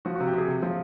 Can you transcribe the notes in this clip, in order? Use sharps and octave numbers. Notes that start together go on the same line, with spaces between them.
F3 F#4
F#4
C3
G4
C3 G#4
C3
F3